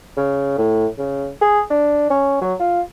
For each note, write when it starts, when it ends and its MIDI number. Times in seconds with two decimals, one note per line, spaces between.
0.17 0.56 49
0.58 0.87 45
0.98 1.29 49
1.41 1.62 68
1.70 2.10 62
2.10 2.41 61
2.42 2.54 54
2.60 2.81 65